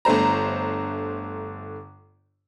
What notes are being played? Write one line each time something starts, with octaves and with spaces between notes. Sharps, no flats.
G1 D3 A3 C5 A#5